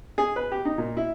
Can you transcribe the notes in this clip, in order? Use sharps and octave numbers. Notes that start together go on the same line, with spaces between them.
G#4
B4
G4
D#4
A#2
E4